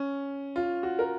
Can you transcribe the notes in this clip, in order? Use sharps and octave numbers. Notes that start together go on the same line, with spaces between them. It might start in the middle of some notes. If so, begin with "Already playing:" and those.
Already playing: C#4
F4
F#4
A#4